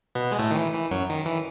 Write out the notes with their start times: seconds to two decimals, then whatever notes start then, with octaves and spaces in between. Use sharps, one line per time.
0.15 B2 B3
0.32 G#3
0.38 A2 A3
0.51 D#3
0.56 E3
0.74 E3
0.91 F#2 F#3
1.10 D#3
1.26 E3